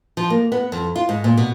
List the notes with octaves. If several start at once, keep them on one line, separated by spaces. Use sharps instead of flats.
F3
A#3
B3
F2
F4
G#2
A#2
B2